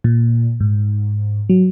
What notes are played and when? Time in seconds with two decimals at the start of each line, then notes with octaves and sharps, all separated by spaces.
0.04 A#2
0.60 G#2
1.50 F#3